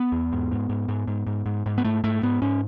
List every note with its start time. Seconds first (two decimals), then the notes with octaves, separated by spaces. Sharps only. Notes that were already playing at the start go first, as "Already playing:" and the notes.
Already playing: B3
0.12 E2
0.32 G#2
0.51 G#2
0.69 G#2
0.88 G#2
1.08 G#2
1.27 G#2
1.46 G#2
1.66 G#2
1.78 B3
1.84 G#2 A3
2.04 G#2 A3
2.23 G#2 B3
2.42 G#2 C#4